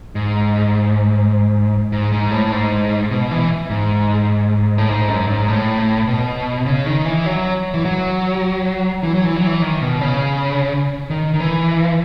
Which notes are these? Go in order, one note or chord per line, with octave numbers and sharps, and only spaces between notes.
G#2
G#2
G#2
A2
G#2
B2
E3
G#2
A2
G#2
F#2
G#2
A2
B2
C#3
D#3
E3
F#3
E3
F#3
E3
F#3
E3
F#3
E3
D#3
B2
C#3
D#3
D#3
E3